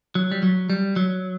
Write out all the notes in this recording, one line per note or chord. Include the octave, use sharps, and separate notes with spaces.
F#3
G3
F#3
G3
F#3